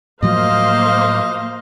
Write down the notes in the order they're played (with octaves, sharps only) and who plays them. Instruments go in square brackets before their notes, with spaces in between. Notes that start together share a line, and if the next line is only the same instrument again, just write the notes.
[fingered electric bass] A2 F3 F#3 [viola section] A#3 C5 F5 [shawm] D#5